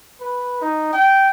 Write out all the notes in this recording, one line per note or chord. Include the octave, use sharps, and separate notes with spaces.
B4
D#4
G5